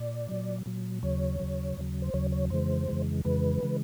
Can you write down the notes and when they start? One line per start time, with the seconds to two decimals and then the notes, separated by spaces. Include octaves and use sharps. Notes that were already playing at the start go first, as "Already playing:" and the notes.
Already playing: A#2 D5
0.29 A#2 F#3
0.66 A#2 F#3
1.03 D#2 C#3 F#3 C#5
1.40 D#2 C#3 F#3
1.77 D#2 C#3 F#3
2.02 C5
2.14 D#2 C#3 F#3 C#5
2.32 C#5
2.50 F2 C#3 E3 G#3 C5
2.88 F2 C#3 E3 G#3
3.25 F2 C#3 E3 G#3 B4
3.63 C#3 E3 G#3